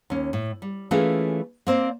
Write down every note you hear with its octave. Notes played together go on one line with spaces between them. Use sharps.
D#2 C#4
A2
G3
E3 A3 A#3 C#4 F4 G#4
A#3 C4 C5 D5